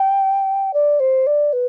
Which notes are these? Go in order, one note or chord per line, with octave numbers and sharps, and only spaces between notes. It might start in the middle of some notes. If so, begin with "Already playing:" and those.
Already playing: G5
D5
C5
D5
B4